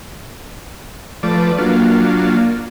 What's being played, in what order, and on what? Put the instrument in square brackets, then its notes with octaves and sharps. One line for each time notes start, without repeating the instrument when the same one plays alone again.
[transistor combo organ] F3 A3 D5 [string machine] B4
[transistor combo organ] F#3 D4 F4 [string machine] A#3